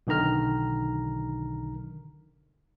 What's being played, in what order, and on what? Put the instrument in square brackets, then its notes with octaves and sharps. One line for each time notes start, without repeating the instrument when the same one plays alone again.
[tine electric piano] B1 D3 D#3 A#5 F6